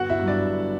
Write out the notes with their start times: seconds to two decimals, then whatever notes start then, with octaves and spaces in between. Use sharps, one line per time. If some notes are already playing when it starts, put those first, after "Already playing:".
Already playing: G1 F#4 F#5
0.10 E4 E5
0.19 G2 F#3
0.28 D4 D5
0.46 G1